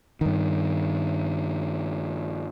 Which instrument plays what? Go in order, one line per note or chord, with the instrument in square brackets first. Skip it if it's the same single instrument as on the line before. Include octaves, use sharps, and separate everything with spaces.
[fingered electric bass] G2 D#3